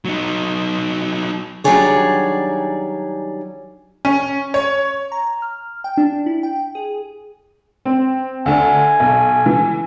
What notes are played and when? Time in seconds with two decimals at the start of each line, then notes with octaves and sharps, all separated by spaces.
0.05 F#3 D#4
1.64 D#3 F#3 G3 D4 G#4 C#5
4.05 C#4
4.54 C#5
5.12 A#5
5.42 F6
5.84 G5
5.97 D4
6.26 E4
6.43 G5
6.75 G#4
7.85 C4
8.46 D2 D3 G#5
9.00 B1
9.46 E3